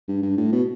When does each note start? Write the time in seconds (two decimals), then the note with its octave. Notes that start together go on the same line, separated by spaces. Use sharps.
0.08 G2
0.22 G2
0.37 A2
0.52 B2